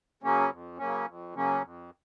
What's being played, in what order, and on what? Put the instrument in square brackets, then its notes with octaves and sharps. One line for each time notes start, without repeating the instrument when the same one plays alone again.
[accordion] C#3 F#3 A#3 C#4
F2
C#3 F#3 A#3 C#4
F2
C#3 F#3 A#3 C#4
F2